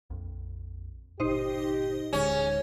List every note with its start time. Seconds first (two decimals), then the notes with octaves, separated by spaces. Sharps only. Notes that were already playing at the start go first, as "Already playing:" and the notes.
0.10 A#1 F2
1.20 G1 A#2 D#4 G4 C5 D#5
2.13 D1 D3 G#3 C#4 G#4